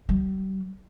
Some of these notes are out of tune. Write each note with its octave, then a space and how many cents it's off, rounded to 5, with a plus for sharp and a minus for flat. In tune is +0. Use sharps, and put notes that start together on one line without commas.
G3 -45